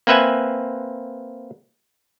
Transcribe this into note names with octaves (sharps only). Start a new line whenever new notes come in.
A#3 C4 B4 E5 F#5 G#5